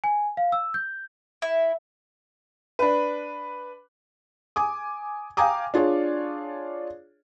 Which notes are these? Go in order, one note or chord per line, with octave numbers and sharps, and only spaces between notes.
G#5
F5
E6
G6
E4
D4 B4
G#5 D6 D#6
F5 G5 G#5 A#5 D6 D#6
D4 F4 G#4 C#5 D5